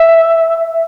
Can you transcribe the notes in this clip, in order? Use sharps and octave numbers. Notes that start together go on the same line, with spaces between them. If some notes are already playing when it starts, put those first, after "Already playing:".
Already playing: E5